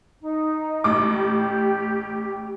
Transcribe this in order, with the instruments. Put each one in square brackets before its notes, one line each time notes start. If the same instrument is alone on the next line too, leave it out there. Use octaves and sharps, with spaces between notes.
[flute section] D#4
[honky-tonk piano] A1 D6
[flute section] G4